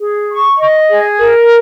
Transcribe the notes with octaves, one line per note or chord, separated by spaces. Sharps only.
G#4
C#6
D#5
G#4
A#4